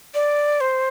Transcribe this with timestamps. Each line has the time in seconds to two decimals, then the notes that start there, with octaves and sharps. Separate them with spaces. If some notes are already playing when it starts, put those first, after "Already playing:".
0.14 D5
0.61 C5